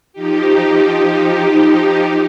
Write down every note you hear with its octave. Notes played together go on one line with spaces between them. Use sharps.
F3 D#4 G4